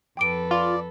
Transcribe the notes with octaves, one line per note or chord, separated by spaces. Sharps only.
F2 A4 B4 G5 D6 D7
F4 D5